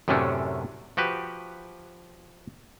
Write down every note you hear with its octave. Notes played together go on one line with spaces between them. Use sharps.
F#2 A2 C3 A3 C#4 D4
F3 F#4 G4 B4